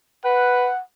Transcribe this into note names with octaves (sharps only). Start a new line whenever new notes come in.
B4 F#5